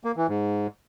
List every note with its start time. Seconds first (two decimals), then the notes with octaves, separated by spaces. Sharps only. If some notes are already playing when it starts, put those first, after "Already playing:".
0.04 A#3
0.16 E3
0.28 G#2